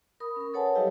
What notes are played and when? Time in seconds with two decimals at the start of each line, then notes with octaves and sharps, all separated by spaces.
0.20 A#4 B5 D#6
0.36 C#4 A#4
0.54 A4 B4 C#5 F#5 G#5 A5
0.75 F#3 G3 E4 G4 D#5 F5